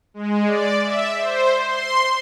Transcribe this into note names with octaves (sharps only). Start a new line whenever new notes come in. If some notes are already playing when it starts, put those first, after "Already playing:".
G#3
D5
E5
C5
C6